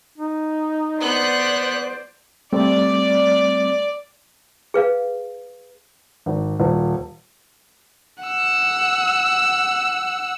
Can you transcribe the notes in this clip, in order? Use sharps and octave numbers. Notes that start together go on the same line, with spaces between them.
D#4
B3 C5 D5 F#6
G3 A3 C4 D5
G#4 B4 F5
G#1
D#1
F#5 E6